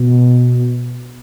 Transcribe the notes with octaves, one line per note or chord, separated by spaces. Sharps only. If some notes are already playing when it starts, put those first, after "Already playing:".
Already playing: B2